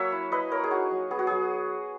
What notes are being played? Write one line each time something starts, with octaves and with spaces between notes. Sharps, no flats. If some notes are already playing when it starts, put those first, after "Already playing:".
Already playing: F#3 A#3 C#5 E5 F#5 G#5
E4
E4 B4 D#5
A#3 A#4 C#5
G#4
D#4 F#4
F#3
B3 G#4
F#4
F#3 G#4